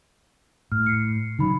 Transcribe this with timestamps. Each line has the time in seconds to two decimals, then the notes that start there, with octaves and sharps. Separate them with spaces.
0.72 A2 F6
0.86 C7 C#7
1.39 C#3 F#3 D#4 B5